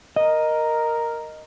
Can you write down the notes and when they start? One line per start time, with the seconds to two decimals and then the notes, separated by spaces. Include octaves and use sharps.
0.16 A#4 D#5